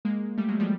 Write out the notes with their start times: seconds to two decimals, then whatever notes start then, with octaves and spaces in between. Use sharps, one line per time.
0.05 G#3 A#3
0.38 G3 A3
0.48 F#3 G#3
0.60 F3 G3